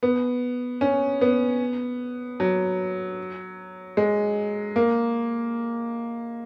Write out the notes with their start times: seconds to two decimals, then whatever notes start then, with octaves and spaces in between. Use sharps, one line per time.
0.03 B3
0.81 C#4
1.21 B3
2.40 F#3
3.97 G#3
4.76 A#3